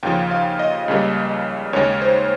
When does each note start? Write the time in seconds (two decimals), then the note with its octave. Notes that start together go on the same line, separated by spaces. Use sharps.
0.03 D#2 C#3 F3 G5
0.31 F5
0.59 D#5
0.88 C#2 C#3 G3 A#3
1.73 D#2 C#3 G#3 C#5
2.02 C5